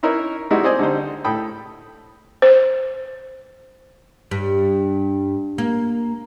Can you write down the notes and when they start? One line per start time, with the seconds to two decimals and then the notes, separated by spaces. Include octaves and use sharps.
0.03 C#4 D#4 E4 A#4 B4
0.50 G3 G#3 B3 D#4 E4 F#4
0.64 C4 C5 D5 D#5 G#5
0.79 D3 G3 D#4 C5
1.24 A2 A4 G5 B5 D#6
2.42 C5
4.31 G2
5.58 A#3